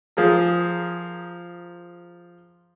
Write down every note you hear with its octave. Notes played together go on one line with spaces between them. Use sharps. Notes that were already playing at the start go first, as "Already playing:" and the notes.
F3 G#4 A#4